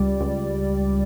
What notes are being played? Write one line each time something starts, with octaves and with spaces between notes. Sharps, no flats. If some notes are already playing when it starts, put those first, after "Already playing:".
Already playing: C#2 G3 D5
C#2